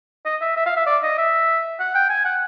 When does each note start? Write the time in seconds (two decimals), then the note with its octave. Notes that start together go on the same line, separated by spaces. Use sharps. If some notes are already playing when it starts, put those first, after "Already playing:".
0.25 D#5
0.41 E5
0.56 E5
0.66 F5
0.77 E5
0.86 D5
1.03 D#5
1.18 E5
1.80 F#5
1.95 G5
2.10 G#5
2.25 F#5